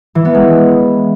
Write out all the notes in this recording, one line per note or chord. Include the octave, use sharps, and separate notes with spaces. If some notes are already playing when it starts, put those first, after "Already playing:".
E3
B3
G#3